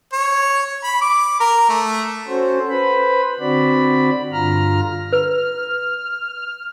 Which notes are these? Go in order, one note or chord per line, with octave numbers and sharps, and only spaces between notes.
C#5
B5
D6
A#4
A3
C#4 F#4 A4 C5
B4 C5 B5
D3 C4 F#4 D5 B5
G2 D3 F4 A#5 F6
B4 F6